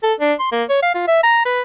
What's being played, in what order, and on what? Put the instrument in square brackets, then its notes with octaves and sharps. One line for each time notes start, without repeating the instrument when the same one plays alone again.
[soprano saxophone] A4
D4
C6
A#3
C#5
F5
F4
E5
A#5
B4